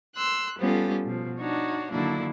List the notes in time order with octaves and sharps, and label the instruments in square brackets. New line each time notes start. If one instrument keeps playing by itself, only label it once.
[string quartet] C6 E6 F#6
G3 B3 C#4 F4 G4 A4
B2 F3
D4 D#4 F#4 C#5
D3 D#3 F#3 A#3 D4 E4